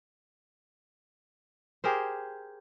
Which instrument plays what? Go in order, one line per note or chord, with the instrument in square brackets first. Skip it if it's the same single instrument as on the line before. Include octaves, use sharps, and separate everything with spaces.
[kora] G4 G#4 A#4 C5